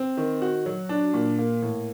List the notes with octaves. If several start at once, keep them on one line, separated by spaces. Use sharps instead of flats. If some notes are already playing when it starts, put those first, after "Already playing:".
Already playing: C4
D#3
F#4
F#3
D4
A#2
A#3
A2